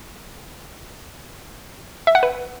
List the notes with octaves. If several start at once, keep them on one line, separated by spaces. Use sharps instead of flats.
E5
F#5
B4